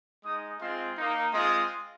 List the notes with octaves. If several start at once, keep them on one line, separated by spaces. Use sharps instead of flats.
G#3 D#4 D#6
G#3 C4 F4 C6
A#3 D#4
G#3 C4 F4 D#6